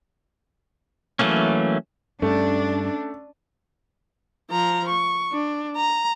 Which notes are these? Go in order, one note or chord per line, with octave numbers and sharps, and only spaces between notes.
E3 F#3 A3 A#3 C#4
G2 A3 C#4 D4
F3 A#5
C#6
D4
A#5